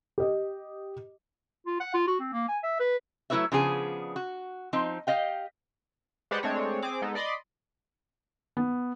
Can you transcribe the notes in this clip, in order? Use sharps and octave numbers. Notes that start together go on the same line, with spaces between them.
G4 D#5
F4
F#5
F4
F#4
C4
A#3
G#5
E5
B4
F#3 A3 E4 B4 C#5 E5
C#3 F3 B3 D4 G#4
F#4
F3 C4 D#4
G4 D#5 F5 G5
G#3 G4 B4 C5 D5 F#5
G#3 A3 C4 D4 C#5
C4 G#4 D6
G#3 B3 D#4 A4
D5 D#5 B5 C6 D6
B3